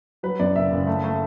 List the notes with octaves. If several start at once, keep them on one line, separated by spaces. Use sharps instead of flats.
F#3 B4
F#2 D5
F#1 E5
F#1
A3
A3